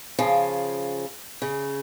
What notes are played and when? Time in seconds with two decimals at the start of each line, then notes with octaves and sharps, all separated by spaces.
0.18 C#3 F3
1.42 C#3